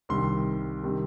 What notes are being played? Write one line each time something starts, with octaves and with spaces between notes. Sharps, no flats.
C2 C3 D#3 G3 C6
C3 D#3 G3